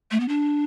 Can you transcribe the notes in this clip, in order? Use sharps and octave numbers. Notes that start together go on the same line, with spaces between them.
A3
B3
D4